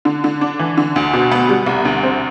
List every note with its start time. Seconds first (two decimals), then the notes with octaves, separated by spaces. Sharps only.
0.05 D3
0.24 D3
0.41 D4
0.59 E3
0.77 D3
0.96 D2
1.13 B2
1.32 B3
1.49 G3
1.66 C2
1.85 D2
2.03 C4